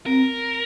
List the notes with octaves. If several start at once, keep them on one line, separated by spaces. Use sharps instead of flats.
C4 A#4